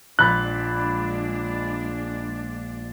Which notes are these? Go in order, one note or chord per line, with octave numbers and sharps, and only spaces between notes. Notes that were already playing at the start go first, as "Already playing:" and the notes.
A#1 G#3 D4 B5 F#6 A6